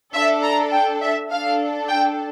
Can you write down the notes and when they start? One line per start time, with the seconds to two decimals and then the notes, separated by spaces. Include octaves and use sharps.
0.14 D4 A4 E5
0.43 A#5
0.72 G5
1.01 E5
1.30 D4 A4 F5
1.88 G5